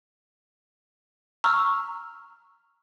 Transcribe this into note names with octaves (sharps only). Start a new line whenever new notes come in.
A#5 C#6 E6 F6